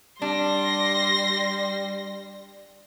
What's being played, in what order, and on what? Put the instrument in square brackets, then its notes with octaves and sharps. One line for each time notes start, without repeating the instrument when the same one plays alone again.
[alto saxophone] G3 [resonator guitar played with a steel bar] D4 [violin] C6 A#6